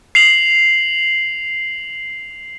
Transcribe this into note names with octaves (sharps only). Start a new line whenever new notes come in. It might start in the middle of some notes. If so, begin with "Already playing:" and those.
C7 F7 F#7